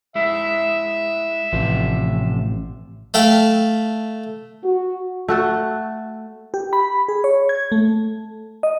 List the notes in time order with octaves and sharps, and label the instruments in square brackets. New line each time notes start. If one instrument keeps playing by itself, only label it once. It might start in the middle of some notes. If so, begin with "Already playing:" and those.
[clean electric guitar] G#3 E4 [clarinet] E5
[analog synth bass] A1 [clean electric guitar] C3 F3 F4
[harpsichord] A3 F5 G5
[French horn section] F#4
[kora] A3 F#4 A4
[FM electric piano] G4
B5
G#4
C#5
G#6
A3
D#5